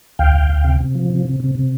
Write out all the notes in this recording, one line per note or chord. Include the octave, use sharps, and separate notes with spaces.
D2 F5 G5
D2
D2
C3
C3
F3
C3
C3
C3
C3